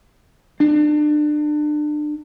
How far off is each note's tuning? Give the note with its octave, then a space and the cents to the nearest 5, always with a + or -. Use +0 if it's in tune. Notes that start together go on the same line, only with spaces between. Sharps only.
D4 +30